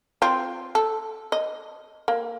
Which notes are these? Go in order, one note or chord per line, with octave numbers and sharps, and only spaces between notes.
C4 F4
A4
D#5
A#3